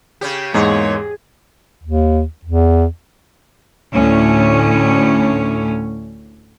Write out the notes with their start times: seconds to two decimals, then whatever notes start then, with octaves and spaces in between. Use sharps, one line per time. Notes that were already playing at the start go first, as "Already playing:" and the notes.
0.21 C#3 C#4 G4
0.54 E2 G#2 G#3 A#3 G#4 C#5
1.83 D#2
2.45 E2
3.92 D2 A2 C#4